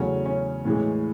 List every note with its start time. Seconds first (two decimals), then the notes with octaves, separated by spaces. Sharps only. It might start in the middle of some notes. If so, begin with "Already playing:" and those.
Already playing: E2 C#3 F#3 A3 C#4
0.26 C#4
0.65 A2 E3 G#3